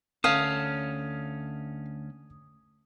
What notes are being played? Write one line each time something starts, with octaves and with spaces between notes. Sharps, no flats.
D2 C#4 A4 F5 D#6